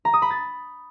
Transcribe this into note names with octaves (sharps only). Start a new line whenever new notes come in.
A#5
D#6
B5
A6